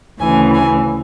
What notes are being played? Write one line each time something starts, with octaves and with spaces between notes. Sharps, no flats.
D2 C#3 E3 G#5
G#5